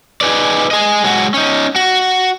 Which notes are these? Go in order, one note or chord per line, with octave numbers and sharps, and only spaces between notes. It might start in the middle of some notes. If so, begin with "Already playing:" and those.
D#4 G#4 B4 D5
G#4 D#5
F#3 G#3 F#4
C#4 D#4
F#4